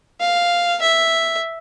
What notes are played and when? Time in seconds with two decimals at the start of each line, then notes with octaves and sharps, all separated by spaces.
0.20 F5
0.82 E5